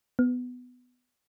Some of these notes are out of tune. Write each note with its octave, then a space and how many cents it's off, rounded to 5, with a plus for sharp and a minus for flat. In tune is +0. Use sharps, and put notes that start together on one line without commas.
B3 +10